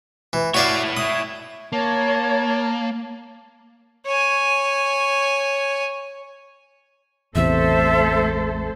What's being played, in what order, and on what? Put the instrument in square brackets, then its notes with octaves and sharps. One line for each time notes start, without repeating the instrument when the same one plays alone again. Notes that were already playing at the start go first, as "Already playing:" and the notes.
[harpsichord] E3
[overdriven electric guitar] E4 C#5 [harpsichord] F#4 D5 F5
[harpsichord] D#6
[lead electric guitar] A#3 [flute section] C#5 [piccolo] A5
[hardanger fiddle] C#5 G#5
[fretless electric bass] A1 E2 C3 [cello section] A3 A4 C5 [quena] E5